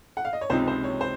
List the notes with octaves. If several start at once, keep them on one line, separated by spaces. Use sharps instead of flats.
F#5
F5
D#5
C#5
C#2 C3 F3 C4 D#4 C5
C5
C#5
C5